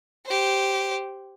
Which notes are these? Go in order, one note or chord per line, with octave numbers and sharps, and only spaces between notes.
G4 C5